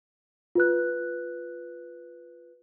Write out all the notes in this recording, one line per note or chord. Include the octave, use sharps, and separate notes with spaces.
F4 B4 F#6